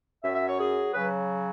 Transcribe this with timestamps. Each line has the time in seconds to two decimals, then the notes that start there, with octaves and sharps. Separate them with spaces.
0.23 F#2 E5
0.27 F#3
0.35 E5
0.47 C#5
0.59 G#4
0.94 C#3 F#3 B4